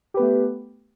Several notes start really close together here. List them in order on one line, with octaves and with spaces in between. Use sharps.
G4 B4 B3 A3